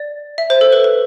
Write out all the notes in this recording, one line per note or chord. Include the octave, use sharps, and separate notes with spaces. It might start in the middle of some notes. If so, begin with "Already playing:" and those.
Already playing: D5
E5
C5
A4
B4
B4